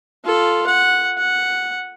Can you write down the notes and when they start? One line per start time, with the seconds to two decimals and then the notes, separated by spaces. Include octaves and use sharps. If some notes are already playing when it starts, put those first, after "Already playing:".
0.25 F4 A4
0.67 F#5
1.18 F#5